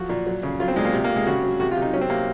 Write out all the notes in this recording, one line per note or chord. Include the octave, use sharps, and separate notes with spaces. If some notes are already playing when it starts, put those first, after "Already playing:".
Already playing: F3 F#3 F#4
A#2
F#3
C#3
F#3 F4
C4
A#2 G#3
A#3
C3
A#3
C3
G#3
C#3 F#4
F#3
C3 F#4
F4
C3
D#4
F#3 C#4
C4
C3 A#3